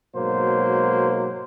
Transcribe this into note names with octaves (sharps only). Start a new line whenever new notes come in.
G#2 B2 F#3 A#3 C5